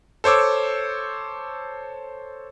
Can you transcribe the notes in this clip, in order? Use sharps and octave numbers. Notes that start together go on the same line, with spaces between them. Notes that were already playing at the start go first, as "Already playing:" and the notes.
A4 C5 C#5 D6 E6